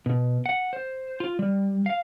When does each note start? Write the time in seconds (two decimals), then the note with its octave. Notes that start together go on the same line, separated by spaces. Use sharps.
0.06 B2
0.46 F#5
0.73 C5
1.20 F4
1.39 G3
1.86 F5